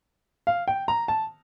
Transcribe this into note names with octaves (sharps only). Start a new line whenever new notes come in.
F5
G5
A#5
A5